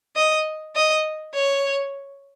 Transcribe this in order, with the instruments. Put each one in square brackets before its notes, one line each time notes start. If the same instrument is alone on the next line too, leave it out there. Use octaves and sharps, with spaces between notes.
[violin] D#5
D#5
C#5